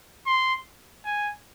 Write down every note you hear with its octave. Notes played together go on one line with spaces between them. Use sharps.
C6
G#5